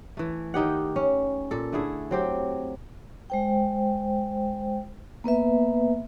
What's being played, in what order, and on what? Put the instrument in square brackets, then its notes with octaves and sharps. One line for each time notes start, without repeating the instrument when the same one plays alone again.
[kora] E3 A3
D#3 D#4 G4 F#5
C#4
A#2 A4
D3 A3 E4 G#4
F#3 C4 G4
[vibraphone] G#3 C5 G5
A#3 B3 B4 E5